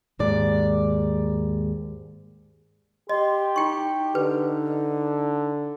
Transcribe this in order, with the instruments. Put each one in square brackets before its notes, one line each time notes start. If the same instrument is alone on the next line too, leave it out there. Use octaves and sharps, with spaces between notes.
[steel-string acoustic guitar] D#2 G#2 D5
[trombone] G4 [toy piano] D#5 [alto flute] C6
[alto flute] D#4 [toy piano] E4 G5 C#6
[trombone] D3 [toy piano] B4